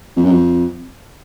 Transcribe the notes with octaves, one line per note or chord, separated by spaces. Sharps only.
F2
F#2
F2